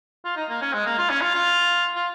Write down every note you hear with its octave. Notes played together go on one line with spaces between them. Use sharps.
F4
D#4
A#3
C#4
G#3
A#3
F4
C#4
F4
F4
F4